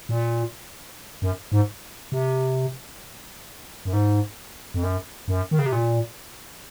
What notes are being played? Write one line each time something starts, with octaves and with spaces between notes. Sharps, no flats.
A#2
F#2
G#2
C3
F#2
G#2
F2
F#2
F#2
D#3
C#3
C3
A#2